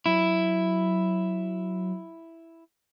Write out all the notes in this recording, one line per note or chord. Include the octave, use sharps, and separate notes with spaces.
F#3 E4